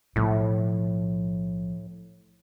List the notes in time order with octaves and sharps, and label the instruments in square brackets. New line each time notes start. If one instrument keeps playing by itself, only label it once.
[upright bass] B1 F3 [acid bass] A2